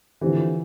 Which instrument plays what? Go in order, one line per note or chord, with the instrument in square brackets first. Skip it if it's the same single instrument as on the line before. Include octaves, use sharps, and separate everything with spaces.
[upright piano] D3 F3 C4 E4 G4 [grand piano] E3